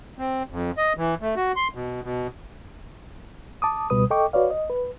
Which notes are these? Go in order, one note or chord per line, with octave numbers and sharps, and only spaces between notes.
C4
F2
D#5
E3
A3
F#4
C6
B2
B2
A5 D6 D#6
C#2 B2 G3 B4 D#6
A4 D#5 G5 C#6 D6
F#4 B4 C#5 D5 F5
D#5
B4